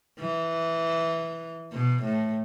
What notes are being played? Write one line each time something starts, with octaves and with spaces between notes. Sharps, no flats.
E3
B2
A2